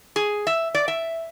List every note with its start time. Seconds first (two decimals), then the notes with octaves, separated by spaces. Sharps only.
0.16 G#4
0.47 E5
0.75 D5
0.88 E5